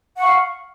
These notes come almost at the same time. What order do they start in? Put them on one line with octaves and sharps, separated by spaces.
F#5 C#6 F5